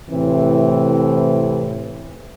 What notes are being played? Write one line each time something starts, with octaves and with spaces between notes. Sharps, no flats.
A2 C3 E3 C4